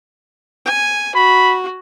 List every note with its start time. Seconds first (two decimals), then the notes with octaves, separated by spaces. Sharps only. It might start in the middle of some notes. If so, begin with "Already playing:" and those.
0.66 G#5
1.15 F#4 B5